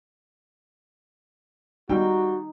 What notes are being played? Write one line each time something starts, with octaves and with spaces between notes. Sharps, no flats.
G3 D#4 F#4 G5